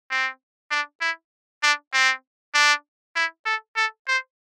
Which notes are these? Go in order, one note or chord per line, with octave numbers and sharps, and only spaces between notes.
C4
D4
E4
D4
C4
D4
E4
A4
A4
C5